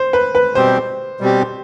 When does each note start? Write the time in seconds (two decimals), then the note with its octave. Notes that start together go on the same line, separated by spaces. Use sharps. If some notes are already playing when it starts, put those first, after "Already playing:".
Already playing: C5
0.13 B4
0.35 B4
0.55 B2 G3 C4 G4 C5
1.20 B2 G3 C4 G4